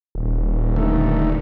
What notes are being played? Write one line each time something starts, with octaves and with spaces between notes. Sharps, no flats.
D#1
D3 D#3 A3